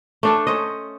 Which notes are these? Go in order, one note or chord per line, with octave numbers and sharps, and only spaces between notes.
A3 D4 A4
C#4 C5 D#5